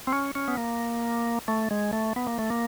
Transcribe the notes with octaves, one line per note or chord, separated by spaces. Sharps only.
C4
C#4
C#4
B3
A#3
A3
G#3
A3
B3
A#3
A3
A#3